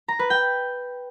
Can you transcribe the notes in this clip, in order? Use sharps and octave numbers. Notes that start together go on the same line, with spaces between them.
A#5
B4
G5